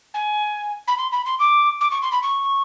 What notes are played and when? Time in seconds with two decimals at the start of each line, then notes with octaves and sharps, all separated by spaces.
0.14 G#5
0.88 B5
0.98 C6
1.12 B5
1.26 C6
1.39 D6
1.81 D6
1.91 C#6
2.02 C6
2.12 B5
2.23 C#6